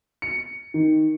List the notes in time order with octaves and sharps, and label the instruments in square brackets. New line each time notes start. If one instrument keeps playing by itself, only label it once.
[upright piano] C#7
D#3